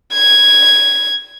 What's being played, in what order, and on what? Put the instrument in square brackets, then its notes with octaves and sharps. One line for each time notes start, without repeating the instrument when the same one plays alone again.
[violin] G#6